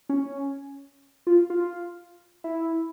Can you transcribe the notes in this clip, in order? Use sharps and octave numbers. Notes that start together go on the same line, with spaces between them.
C#4
F4
F4
E4